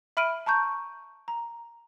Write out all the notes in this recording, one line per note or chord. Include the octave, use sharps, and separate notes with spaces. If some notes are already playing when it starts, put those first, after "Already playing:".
E5 B5 F6 D7 D#7
A5 A#5 C#6 G6
A#5